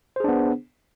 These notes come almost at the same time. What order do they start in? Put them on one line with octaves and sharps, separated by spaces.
C5 G#4 D4 B3